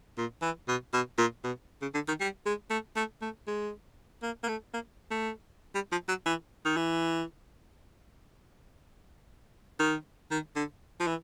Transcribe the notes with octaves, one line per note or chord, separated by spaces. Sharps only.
A#2
E3
B2
B2
A#2
B2
C#3
D3
D#3
G3
G#3
A3
A3
A3
G#3
A#3
A#3
A3
A#3
A3
G3
F3
F#3
E3
D#3
E3
D#3
D#3
D3
F3
E3